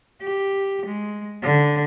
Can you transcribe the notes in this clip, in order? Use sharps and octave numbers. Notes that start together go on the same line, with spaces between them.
G4
G#3
D3